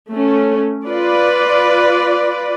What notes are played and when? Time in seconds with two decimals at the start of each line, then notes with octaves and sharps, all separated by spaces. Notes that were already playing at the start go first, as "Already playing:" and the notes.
0.12 A3 C#4
0.88 F4 B4 D5